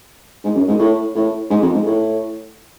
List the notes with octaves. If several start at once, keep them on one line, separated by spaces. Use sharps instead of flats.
G#2
F#2
G#2
A2
A2
G#2
F2
G#2
A2